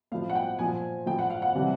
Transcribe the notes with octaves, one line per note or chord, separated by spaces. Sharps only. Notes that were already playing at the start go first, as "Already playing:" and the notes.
A2 F3 F5
F#5
G5
A#2 F3 G#5
A2 F3 G5
F#5
F5
F#5
C3 E3 G3